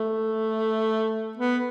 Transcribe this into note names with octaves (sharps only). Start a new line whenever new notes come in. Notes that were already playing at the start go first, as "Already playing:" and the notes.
Already playing: A3
B3